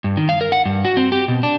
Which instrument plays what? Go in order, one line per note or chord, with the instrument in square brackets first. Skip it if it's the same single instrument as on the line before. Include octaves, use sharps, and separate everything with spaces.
[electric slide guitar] G2
D#3
F5
A#4
F#5
G2
F#4
C4
G4
B2
D4